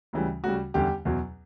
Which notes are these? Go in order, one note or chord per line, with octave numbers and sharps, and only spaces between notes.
D2 C#3 E3 G3
D2 C#3 G3 F#4
E2 D3 G3 G4
E2 B2 F#3